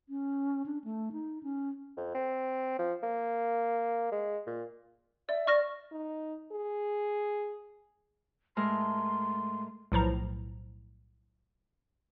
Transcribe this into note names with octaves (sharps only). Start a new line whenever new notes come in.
C#4
D4
A3
D#4
C#4
F2
C4
F3
A#3
G#3
A#2
D5 E5
D5 C#6 F6 A#6
D#4
G#4
A2 G#3 A#4 C6
B1 A2 F3 A#5